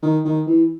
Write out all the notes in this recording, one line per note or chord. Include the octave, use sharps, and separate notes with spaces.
D#3
D#3
E3